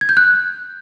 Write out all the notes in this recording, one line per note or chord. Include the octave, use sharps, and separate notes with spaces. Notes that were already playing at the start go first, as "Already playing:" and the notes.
G#6
G6
F#6